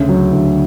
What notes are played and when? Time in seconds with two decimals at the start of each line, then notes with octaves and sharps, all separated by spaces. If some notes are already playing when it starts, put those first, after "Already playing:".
Already playing: D2 C#3
0.09 F#3
0.33 D2